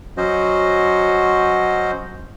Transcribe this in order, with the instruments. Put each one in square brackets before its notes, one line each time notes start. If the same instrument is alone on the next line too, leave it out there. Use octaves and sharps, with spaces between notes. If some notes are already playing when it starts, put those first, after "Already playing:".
[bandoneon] F#3 C#4 F#4 C5 D#5